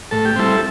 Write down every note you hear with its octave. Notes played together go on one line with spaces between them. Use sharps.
A2 A4
G4
G3 C4 E4 A4